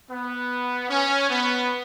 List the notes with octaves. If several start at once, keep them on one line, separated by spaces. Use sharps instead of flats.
B3
C#4
B3